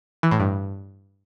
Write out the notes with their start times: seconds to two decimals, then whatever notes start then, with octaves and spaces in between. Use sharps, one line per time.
0.23 E3
0.31 A2
0.40 G2